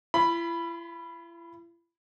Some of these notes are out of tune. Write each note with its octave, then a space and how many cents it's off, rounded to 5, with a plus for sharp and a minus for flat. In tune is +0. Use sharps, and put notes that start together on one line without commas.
E4 +45 B5 +0